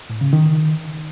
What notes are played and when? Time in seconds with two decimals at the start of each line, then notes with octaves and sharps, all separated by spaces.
0.10 A2
0.21 C#3
0.33 D#3